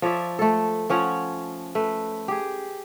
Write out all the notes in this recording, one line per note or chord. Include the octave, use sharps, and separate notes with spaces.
F3 C#5 D5 E5
A3 A4
F3 C#4 C#5 F#5
A3 B4
G4 G#4